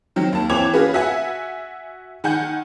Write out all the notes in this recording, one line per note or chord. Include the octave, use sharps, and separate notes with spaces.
D#3 F#3 C4
D#2 A5
E3 C4 C#5 D6 G#6 F7
C#4 F4 F#4 G#4 B4
F#4 E5 F#5 G#5
D#3 F#5 G#5 G6